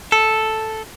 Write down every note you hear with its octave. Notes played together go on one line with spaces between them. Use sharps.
A4